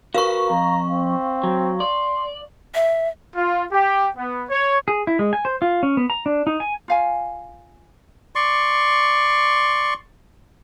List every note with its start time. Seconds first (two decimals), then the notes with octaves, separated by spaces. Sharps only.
0.14 F#4 A#4 B4 F5 C#6
0.50 F2 A#5
0.89 C4
1.43 F#3
1.80 D5 C6
2.75 E5
3.36 F4
3.71 G4
4.16 B3
4.50 C#5
4.88 G#4
5.07 E4
5.19 G#3
5.33 G#5
5.45 C5
5.62 F4
5.83 C#4
5.97 B3
6.10 A#5
6.26 D4
6.47 D#4
6.60 G#5
6.88 F4 F5 G#5
8.35 D5 C6 C#6